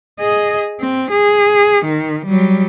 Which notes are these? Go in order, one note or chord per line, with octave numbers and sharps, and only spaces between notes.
G#4 D#5
C4
G#4
D#3
F#3 G3